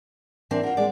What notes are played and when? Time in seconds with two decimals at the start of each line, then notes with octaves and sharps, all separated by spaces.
0.51 E3 C4 D4 A#4
0.63 F4 A#4 F#5
0.77 G#3 D5